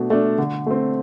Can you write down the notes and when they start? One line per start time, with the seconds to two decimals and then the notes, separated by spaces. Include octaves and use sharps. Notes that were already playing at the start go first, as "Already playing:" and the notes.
Already playing: B2 A3 D4
0.10 A3 D4
0.38 D3
0.66 A3 C4